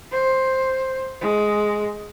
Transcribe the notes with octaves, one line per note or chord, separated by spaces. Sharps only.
C5
G#3